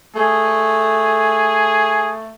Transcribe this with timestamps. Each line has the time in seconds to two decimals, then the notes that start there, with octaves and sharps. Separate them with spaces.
0.16 A3 G#4